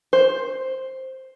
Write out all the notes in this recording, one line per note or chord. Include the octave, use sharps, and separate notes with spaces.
C5